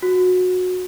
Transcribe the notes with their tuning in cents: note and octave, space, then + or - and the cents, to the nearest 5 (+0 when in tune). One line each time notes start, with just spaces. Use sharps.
F#4 -20